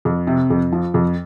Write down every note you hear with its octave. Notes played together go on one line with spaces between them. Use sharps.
F2
C3
F2
F3
F2